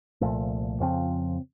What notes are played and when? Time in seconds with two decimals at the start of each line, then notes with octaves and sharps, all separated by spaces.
0.21 C2 A#2 F3 A3
0.80 F2 C#3 F3 C4